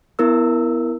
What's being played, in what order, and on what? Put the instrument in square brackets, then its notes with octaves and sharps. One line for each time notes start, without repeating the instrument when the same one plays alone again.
[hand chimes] B3 E4 A#4 E6